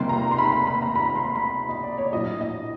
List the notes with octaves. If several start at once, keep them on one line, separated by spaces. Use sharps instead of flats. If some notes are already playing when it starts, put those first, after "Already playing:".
Already playing: C#2 C3 D#3 G3 A#3 C6
A#5
C6
B5
B5
B5
A#5
B5
C6
B5
D#5
D5
C#5
A#1 A2 F#3 D#5
D#5